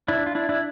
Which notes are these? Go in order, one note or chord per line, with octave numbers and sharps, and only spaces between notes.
D4 E4
F4
D4 E4
D4 E4